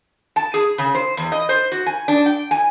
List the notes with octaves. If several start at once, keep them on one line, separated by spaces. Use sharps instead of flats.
A5
G#4
C#3
C5
E2
D#5
C5
F#4
G#5
D4
G5
G#5